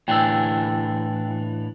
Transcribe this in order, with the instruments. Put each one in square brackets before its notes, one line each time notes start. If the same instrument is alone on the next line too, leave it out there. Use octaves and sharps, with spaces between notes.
[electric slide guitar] A2 E3 D4 [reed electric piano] G5 G#5 E6